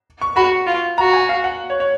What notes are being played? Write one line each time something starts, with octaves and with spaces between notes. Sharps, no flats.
C#6
F#4 B5
F4
F#4 A#5
G#5
F5
F#5
C#5
C#5